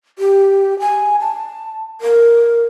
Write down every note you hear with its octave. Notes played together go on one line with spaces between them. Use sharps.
G4
G#5
A5
A#4